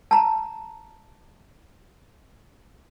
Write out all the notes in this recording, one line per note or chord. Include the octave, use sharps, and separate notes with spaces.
A5 A#5